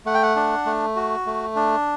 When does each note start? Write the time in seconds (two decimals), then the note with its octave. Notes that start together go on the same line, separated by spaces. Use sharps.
0.05 A3 F#5
0.14 G5
0.23 F#5
0.36 D4
0.66 A3
0.96 F#4
1.26 A3
1.56 D4